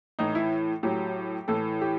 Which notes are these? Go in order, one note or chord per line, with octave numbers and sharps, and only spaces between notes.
A2 E3 D#4
E4
A2 F#3 G4
A2 E3 A4
G4